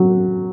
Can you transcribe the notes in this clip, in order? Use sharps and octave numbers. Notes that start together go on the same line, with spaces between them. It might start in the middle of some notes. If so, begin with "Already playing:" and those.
Already playing: F#3